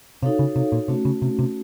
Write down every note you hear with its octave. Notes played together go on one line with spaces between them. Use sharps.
C3 D#4 F#4 A4 C#5 F5
C#3
C3
A#2
C3 A3 C#4 F#4
C#3
C3
C3